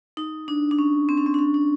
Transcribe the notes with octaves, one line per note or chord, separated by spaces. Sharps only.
D#4
D4
D4
C#4
C4
C#4
C4
D4
C#4
D4